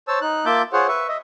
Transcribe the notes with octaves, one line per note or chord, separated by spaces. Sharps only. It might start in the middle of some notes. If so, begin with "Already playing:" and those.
C5 C#5 A5 E6
D#4 F#6
A#3 F4 E5 A5 D6 G6
F4 G#4 C5 C#5 F#5
B4 E5 C#6
D#5 E5